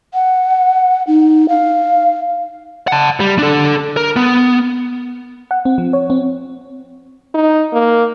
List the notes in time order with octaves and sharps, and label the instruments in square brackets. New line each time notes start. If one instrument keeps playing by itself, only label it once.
[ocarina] F#5
D#4
F5
[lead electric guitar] F#5 A5
G3
D4 A4
A#4
B3
[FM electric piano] F#5
C4
F3
C#5
C4
[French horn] D#4
A#3